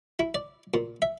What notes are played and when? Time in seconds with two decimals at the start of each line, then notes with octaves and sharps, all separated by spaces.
0.19 E4
0.35 D5
0.74 A#2
1.02 E5